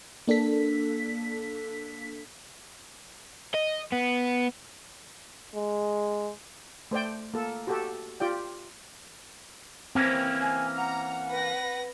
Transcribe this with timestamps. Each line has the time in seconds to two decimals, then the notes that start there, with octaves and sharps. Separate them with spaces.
0.28 A#3 D4 A4 B6
3.54 D#5
3.92 B3
5.54 G#3
6.91 A3 C5 D5 G5
7.34 A#3 A4
7.67 F#4 G4 A4
8.20 F4 G4 D5 G5
9.95 E3 A#3 C4 C#4
10.40 G#5
10.77 F#5 A#5
11.30 B4 A#6